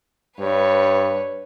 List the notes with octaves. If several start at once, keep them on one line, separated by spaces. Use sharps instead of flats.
G2 B4 C#5